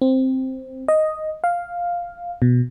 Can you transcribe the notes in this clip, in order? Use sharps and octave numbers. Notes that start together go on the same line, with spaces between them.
C4
D#5
F5
B2